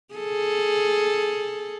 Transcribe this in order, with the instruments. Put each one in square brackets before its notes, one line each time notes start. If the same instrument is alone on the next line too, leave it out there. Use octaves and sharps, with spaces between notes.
[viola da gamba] G#4 A4